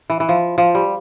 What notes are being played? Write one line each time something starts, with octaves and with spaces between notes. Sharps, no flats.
E3
E3
F3
F3
G3